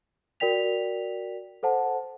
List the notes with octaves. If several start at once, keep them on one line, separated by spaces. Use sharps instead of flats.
F#4 A#4 D5 G5 B6 F7
A4 C5 F#5 A5